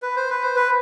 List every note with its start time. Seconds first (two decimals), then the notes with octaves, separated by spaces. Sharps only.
0.02 B4
0.16 C5
0.30 B4
0.43 C5
0.56 B4